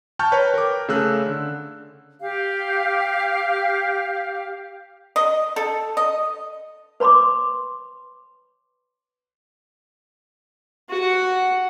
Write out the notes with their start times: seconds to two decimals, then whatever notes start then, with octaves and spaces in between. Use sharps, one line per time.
0.19 G5 A5 C#6 F6 G6
0.32 B4 C#5 G5 A#5
0.54 A#4 D6
0.88 C#3 A3 A4 E6 F#6
1.26 D3
2.20 G4 F5
5.16 D#5
5.56 A4
5.97 D#5
7.00 B4 C#5 B5 C6 D6
10.89 F#4 F#5